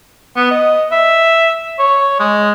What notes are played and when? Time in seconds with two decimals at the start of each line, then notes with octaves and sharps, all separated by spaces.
0.36 B3
0.51 D#5
0.92 E5
1.79 C#5
2.20 G#3